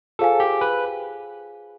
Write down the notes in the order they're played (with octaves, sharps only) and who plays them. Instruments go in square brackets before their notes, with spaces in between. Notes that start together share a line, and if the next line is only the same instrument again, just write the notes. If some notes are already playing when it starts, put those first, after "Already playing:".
[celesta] F4 G#4 C5 F5 G#5 [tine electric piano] A4
[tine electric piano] G4
B4